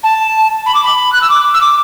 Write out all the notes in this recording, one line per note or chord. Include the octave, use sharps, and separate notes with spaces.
A5
B5
D6
B5
F#6
E6
D6
E6
D6